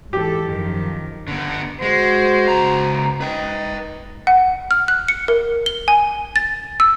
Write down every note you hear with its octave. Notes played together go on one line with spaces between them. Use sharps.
G#2 E3 G4 A4
F#2 D#3 F3
D3 B3
G#3 F#4 C5
C#2 A#5
D#4 B4 G5
F#5
F6
F#6
C#7
A#4
G7
G#5
A6
E6